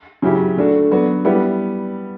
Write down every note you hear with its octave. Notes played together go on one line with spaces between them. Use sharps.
C#3 F#3 C#4 E4 G4
D3 A3 D4 F#4
F#3 B3 D4 F#4
G3 B3 E4 G4